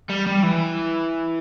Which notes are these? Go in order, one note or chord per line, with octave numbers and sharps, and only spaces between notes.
G3
G3
E3